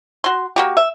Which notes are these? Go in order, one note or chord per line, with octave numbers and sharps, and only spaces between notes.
F#4 C6
A#3 F#4 G4
E5